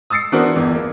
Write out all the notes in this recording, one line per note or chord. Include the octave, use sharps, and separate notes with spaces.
D#6 E6 A6 C7 C#7
E3 B3 D4 F#4 A#4 C5
G1 E2 E3
A#3